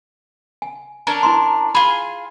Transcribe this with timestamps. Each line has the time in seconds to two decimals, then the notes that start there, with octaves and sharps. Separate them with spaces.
0.62 G#5
1.07 C#4 D4 A#4 A#5
1.23 E4 A#5 C6
1.75 F4 G#4 B5